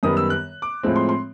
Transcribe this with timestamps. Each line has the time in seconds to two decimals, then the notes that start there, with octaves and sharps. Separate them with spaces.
0.03 F#2 D#3 G3 B3 D#6
0.17 E6
0.30 F#6
0.62 D6
0.83 A2 F3 G#3 C4
0.96 C6
1.09 C6